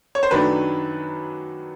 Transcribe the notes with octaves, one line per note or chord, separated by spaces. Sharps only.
C#5
C5
F#2 D#3 F#3 A3 D4 B4